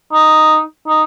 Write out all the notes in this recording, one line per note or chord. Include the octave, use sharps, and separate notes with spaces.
D#4
D#4